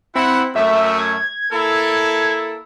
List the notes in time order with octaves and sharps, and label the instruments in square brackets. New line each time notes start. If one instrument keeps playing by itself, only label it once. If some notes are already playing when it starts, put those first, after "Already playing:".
[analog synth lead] C4 [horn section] E4 F#5
[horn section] F#2 A3 [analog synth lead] E5
[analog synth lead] G#6
[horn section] A#3 E4 A4